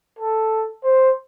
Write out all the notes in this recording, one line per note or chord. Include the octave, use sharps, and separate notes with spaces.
A4
C5